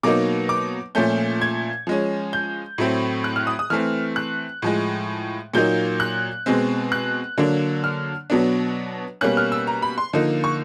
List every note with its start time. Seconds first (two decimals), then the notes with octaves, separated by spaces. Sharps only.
0.03 B2 F#3 A#3 D#4 D6
0.49 D6
0.95 A#2 F3 A3 C#4 G6
1.41 G#6
1.87 F3 G#3 C#4
2.33 G6
2.78 A2 F#3 A3 C4
3.24 F#6
3.36 F6
3.47 D#6
3.59 D#6
3.70 E3 A3 C4 F6
4.16 F#6
4.62 A2 F3 G#3
5.54 A#2 F#3 A#3 D#4 G6
6.00 F#6
6.46 B2 G#3 C4
6.92 F#6
7.38 D3 F#3 A#3 D4
7.84 F6
8.30 B2 F#3 B3 D4
9.21 B2 G3 A#3 C#4 F#6
9.37 F6
9.52 E6
9.67 A#5
9.82 B5
9.98 C6
10.13 D3 F3 A#3 D#4
10.44 C#6